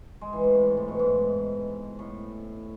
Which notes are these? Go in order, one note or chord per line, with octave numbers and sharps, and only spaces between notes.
G#3
E3
A2
C3
G#2
A2
B2
G#2
A2